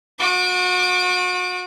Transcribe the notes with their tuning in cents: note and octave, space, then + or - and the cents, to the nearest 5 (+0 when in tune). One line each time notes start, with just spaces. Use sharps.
F#4 -35 D6 +15